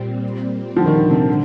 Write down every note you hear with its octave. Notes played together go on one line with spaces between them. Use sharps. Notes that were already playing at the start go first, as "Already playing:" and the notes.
Already playing: A#2 G3 C4
D3 F3
D#3
D3
C3
D3